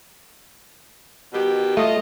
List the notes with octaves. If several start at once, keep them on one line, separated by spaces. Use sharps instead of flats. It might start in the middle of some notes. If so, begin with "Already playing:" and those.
B2 D#3 G4
A3 F4 D#5